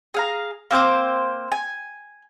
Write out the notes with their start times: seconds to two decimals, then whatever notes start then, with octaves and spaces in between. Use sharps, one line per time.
0.14 G#4 F5 A#5
0.71 A#3 C4 C5 D6
1.52 G#5